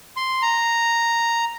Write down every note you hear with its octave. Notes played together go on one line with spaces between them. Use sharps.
C6
A#5